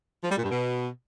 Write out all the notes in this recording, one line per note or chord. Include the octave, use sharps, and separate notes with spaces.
F3
G3
A#2
G2
B2